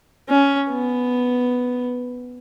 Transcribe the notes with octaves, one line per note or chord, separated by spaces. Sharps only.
C#4
B3